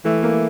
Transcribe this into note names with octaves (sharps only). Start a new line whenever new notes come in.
E3 A3
A#3